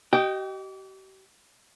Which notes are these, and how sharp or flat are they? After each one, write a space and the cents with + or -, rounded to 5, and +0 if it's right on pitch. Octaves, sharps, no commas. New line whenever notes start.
G4 -40 D#5 +0 G5 +0